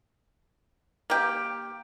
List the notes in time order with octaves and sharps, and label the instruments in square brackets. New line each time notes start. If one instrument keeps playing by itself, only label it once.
[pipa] A#3 G4